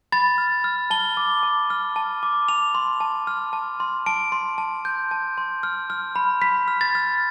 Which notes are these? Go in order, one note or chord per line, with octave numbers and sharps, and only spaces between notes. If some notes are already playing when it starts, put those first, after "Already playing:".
B5 A6
F6
F6
A5 G7
D6
A5
F6
A5
D6
A5 F7
C6
A5
F6
A5
C6
A5 D7
C6
A5
G6
A5
C6
F6
F6
B5
B5 B6
F6
A6
F6